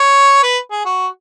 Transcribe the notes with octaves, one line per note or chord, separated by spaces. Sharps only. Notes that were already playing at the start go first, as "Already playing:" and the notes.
Already playing: C#5
B4
G#4
F#4